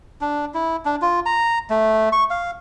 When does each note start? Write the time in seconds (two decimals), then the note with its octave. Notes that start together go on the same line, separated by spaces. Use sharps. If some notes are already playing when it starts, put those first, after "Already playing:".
0.21 D4
0.54 E4
0.85 D4
1.02 F4
1.26 A#5
1.70 A3
2.12 C#6
2.30 F5